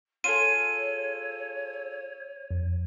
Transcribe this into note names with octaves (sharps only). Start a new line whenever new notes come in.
F4 G#4 A4 C#5 D#7
F2